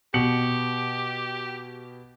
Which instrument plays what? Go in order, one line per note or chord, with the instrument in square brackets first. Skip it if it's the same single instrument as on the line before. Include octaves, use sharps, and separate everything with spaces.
[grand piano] B2 C#7 F#7 [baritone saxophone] G4